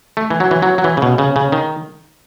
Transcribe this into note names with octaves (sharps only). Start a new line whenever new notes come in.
A3
E3
F#3
E3
F#3
F#3
E3
C#3
B2
C#3
C#3
D#3